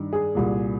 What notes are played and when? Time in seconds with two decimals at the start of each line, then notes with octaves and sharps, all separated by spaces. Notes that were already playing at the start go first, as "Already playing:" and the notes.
Already playing: G2 D#3
0.13 G#4
0.35 C2 A#2